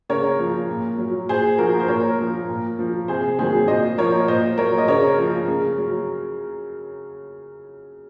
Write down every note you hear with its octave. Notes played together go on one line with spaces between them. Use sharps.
C#3 A#4 C#5
F3
A#2
F#3
A#2 G#4 C5
F3 F#4 A#4
C5
A#2 A#4 C#5
F3
A#2
F3
C3 G#4 C5
D#3 F#3 G#4 C5
A#2 C5 D#5
F3 A#4 C#5
A#2 C5 D#5
F#3 A#4 C#5
D#5
C#3 A#4 C#5
F3
C#3
F#3